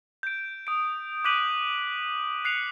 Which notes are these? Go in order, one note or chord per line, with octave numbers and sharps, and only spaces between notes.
G6 D7
D#6 D7
D6 F#6 G6 B6 D#7 F#7
F#6 C7 C#7 F7